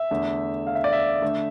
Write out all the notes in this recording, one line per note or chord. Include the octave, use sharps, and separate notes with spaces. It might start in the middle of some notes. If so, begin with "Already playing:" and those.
Already playing: E5
E2 D3 A3
F5
E5
D5
E5
D3 A3